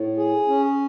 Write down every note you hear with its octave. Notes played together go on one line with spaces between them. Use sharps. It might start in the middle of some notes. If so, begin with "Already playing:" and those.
Already playing: A2
G#4
C#4